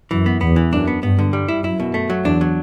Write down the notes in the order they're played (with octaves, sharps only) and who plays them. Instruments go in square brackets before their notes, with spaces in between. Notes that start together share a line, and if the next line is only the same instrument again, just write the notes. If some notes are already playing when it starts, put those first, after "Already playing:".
[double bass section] F#2 [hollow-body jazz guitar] E3
[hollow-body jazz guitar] B3
[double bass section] E2 [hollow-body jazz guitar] B3
[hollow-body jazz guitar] E3
[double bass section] F#2 [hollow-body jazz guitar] D4
[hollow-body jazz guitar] B3
[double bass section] G2 [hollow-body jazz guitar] B3
[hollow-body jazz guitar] D3
G3
E4
[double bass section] F#2 [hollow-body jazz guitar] E4
[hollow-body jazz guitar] B2
A3
F#3
[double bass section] E2 [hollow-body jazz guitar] D4
[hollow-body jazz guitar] F#3